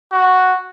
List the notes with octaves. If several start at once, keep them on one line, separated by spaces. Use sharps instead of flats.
F#4